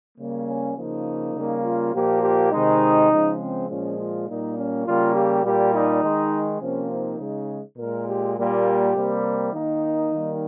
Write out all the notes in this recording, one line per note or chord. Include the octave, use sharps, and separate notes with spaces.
C#3 G3 A#3
C#4
C#3 F3 A#3 D#4
C#3 G3 A#3
F4
A#2 F3 A#3 G4
G4
C3 D#3 G#3 D#4
C#3 F3 G#3
C4
A#2 F3 G#3 C#4
F4
A#2 G3 A#3 D#4
C#4
C#3 G3 A#3 F4
G4
A#2 G3 A#3 G4
D#4
D#3 G#3
C3 F3 A#3 C#4
D#4
C#3 G#3
A#2 G#3 A#4
G4
A#2 G3 A#3 G4
C3 G3 A#3
D#3 A#3 D#4
D#3 G3 A#3